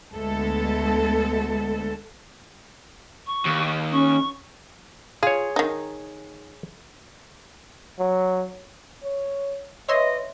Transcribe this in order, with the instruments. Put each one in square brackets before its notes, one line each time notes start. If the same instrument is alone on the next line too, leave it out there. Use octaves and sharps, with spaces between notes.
[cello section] D2 G#3 A3 B3 A4
[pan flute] C#6
[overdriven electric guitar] D#2
[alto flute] C#4 [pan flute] C#6
[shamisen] F4 [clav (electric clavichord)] G#4 C#5
[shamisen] D#3 D#4
[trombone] F#3
[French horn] C#5
[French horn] B4 [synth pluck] C#5 E5 C6 [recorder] D#5